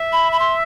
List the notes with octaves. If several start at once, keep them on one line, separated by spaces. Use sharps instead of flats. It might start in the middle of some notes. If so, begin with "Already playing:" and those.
Already playing: E5
B5
B5
C6